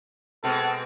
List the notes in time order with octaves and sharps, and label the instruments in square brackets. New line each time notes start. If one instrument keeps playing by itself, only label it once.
[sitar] B2 G#3 C4 [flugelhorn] A4